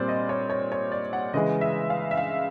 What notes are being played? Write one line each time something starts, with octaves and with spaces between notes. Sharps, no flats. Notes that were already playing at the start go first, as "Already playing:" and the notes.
Already playing: A#2 G3 C4 C5 D5
D#5
C#5
C#5
C#5
D5
F#5
C#3 E3 G#3 D#5
E5
F5
E5
F5